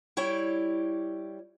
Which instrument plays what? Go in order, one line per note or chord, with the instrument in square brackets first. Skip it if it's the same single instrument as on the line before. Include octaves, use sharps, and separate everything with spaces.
[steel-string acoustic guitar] G3 E4 C#5 G5